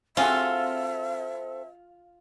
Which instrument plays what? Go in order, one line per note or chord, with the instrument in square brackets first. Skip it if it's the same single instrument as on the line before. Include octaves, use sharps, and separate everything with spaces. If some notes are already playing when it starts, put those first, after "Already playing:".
[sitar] C4 A4 [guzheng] F4 [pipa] F#4 G#4 F5 [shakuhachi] E5